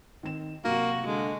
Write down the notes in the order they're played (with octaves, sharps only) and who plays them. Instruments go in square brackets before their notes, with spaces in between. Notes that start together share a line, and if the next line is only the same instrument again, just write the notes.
[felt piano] D#3 C4 E7
[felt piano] C3 F#3 [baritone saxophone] A#3 [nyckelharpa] F#4
[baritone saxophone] D3 [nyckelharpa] G#3